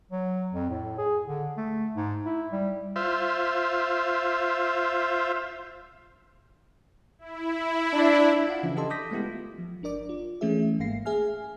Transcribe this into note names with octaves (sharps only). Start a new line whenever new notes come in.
F#3
F2
A2
G#4
D3
A3
G#2
E4
G3
F4 C5 E5
E4
D4
F4 F5 F#5
C#3 E3 F3 C#4 D4
G4 A4 D#5 A5 C6
D6 D#6 G6 A#6 B6
G#3 A3 B3 E4 G4
F4
F3
G1 D4 A#4 D5 D6
F4
E3 A3 C#4 E4 G#4 E5
G#1 G#2 A#3 F5 A#6 C7
G#4 E5 G#5 F6